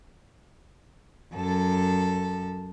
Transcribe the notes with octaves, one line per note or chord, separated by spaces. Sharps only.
F#2 A4